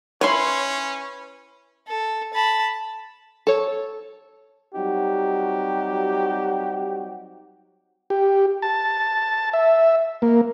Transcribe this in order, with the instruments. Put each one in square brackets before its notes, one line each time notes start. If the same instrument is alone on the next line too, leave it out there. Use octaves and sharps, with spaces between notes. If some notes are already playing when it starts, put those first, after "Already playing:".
[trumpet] C#4 [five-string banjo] E4 C#5 [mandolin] B4 C6
[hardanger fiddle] A4
A5 B5
[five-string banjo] A4 C#5
[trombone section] F#3 G3 C4 D#4 F#4 G4
[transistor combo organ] G4
A5
E5
A#3